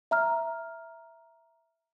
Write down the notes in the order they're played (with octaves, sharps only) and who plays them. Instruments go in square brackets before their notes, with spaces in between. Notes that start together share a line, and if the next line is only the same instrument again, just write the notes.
[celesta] E5 A#5 F6